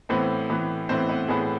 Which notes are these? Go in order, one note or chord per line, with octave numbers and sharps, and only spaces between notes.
A2 E3 B3 C4 C5
A2 E3 B3
A2 E3 B3 C4 C5
B3 B4
A2 E3 B3 G#4